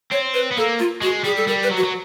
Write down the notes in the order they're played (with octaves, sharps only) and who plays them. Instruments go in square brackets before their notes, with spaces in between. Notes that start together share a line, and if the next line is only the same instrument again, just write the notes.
[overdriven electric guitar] C4 [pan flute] C#5
[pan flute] B4
[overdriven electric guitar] B3
[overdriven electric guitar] A#3 [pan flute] A4
[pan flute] F4
[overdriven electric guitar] G#3 [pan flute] F#4
[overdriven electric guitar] G3 [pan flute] G#4
[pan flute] A4
[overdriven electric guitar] G3 [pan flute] A#4
[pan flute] B4
[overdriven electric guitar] F#3
[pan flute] F#4
[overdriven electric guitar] F#3